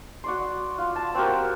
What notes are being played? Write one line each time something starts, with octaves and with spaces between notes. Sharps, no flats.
F#4 D5 C6
F4
A5
C4 F#4 G4 A#4